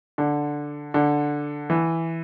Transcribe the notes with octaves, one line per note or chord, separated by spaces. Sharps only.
D3
D3
E3